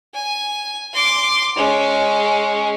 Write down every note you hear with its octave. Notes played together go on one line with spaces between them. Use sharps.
G#5
C6 D6
G#3 C#4